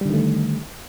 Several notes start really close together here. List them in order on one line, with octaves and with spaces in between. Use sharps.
G3 D3 D#3 A3